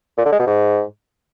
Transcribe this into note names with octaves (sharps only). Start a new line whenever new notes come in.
A#2
D3
G#3
B2
G#2